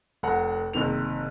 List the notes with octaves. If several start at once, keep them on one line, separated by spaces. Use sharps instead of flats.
F1 F#5 A#5
F#1 C3 D#3 F7